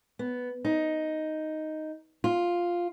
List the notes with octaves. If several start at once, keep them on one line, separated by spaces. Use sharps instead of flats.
B3
D#4
F4